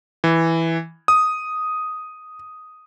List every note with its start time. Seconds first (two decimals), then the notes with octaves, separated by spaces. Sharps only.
0.24 E3
1.08 D#6